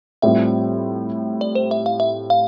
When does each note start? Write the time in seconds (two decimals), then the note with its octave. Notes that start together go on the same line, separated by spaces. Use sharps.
0.22 A2 G3 C4 F4 E5
1.41 D5
1.55 C5
1.71 E5
1.86 F5
2.00 E5
2.30 F5